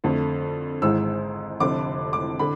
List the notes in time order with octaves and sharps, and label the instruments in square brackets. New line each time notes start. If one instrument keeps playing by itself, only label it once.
[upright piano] F2 D3 A3
G#1 G#2 E3 G#3 E6
F1 F2 D3 D6
D6
D3 B5